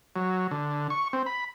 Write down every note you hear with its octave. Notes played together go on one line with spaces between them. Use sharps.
F#3
D3
C#6
C4
B5